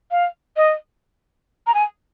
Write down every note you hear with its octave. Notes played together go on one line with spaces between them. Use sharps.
F5
D#5
A#5
G#5